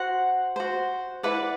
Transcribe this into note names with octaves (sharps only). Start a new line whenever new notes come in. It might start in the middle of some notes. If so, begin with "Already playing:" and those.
Already playing: F#4 C5 F#5
F#4 C5
E4 B4 D5 F#5